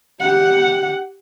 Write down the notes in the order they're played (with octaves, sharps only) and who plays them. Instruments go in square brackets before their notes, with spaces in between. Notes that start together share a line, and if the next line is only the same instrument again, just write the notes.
[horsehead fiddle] G4 F#5